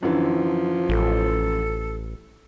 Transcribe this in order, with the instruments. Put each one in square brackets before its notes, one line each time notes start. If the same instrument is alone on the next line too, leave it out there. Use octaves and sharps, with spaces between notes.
[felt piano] F#2 D3 E3 [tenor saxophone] F3
[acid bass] A1 [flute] A4